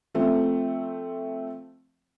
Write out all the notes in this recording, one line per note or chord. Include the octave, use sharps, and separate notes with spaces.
F3 A3 C4